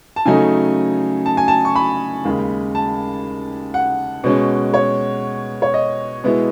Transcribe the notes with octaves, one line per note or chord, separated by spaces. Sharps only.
A5
C#3 F#3 A3 D#4 G#5
A5
G#5
A5
C#6
B5
D#2 C#3 G#3
A5
F#5
B2 G#3 C#4
C#5
C#5
D#5
B2 G#3 B3 E4